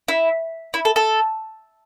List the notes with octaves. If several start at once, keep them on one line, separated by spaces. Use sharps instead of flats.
E4
E4
A4
A4